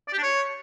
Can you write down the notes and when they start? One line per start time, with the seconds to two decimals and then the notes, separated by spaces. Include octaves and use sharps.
0.08 D5
0.13 G4
0.18 D4
0.23 C#5